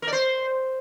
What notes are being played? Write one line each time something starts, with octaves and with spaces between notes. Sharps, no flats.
A#4
D5
C5